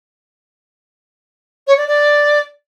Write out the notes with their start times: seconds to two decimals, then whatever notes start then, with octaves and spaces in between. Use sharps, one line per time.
1.67 C#5
1.77 D5
1.88 D5